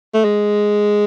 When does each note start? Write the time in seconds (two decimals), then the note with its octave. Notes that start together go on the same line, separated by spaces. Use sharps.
0.14 A3
0.24 G#3